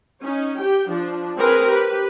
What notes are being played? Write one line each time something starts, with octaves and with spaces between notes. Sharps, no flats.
C#4 D#4
G4 G5
F3 D4
C4 G#4 A#4 B4
G4 B4